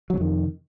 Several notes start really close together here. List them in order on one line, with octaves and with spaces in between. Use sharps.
F#3 C3 F2 D#3